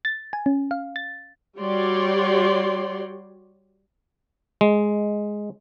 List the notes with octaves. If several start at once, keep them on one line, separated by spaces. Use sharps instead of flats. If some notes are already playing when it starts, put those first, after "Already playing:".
A6
G#5
C#4
F5
A6
G3 F#4 G4 C#5 D5 C6
G#3